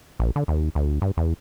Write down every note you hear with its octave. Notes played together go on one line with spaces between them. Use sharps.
A#1
D3
D#2
D2
G2
E2